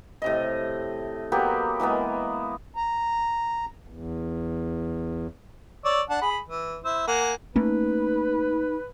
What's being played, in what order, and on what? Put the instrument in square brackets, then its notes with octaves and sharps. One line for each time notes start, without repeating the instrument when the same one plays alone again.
[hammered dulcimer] A2 C3 D#5
F#3 A#3 B3 G4
E3 G#3 A#3 B3
[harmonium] A#5
E2
[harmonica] C#5 D5 E6
D4 F#5 A5
G#4 B5
E3
E4 C5 E6
A#3 F#5 G#5
[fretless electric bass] A3 A#3 C#4 [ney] D#4 [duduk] B4